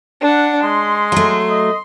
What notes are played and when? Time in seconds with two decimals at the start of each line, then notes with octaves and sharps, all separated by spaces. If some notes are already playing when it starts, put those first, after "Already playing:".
0.21 D4 F#5
0.63 G#3 C6
1.12 F#3 A3
1.50 D#5